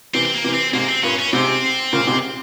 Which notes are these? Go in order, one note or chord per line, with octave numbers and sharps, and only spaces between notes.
C3 E3 C4
C4
A#3
C3 E3
C4
G#2 C3 A#3
C4
G2 A#2 C#4
C#4
G#2 C3 C4
A#2 C#3
G#2 C3